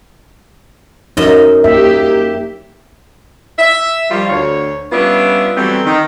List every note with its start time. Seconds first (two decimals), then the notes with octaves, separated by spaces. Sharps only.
1.17 F#2 D#4 D#5
1.64 A#3 G4 E5
3.59 E5
4.11 D#3 F3 G3 F4 F5
4.30 D2 C#5
4.92 G3 B3 C#4 D4 F4 E5
5.56 E3 F#3 G3 A3 B3 C4
5.86 D#3